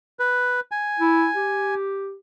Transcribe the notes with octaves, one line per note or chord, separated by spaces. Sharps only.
B4
G#5
E4
G4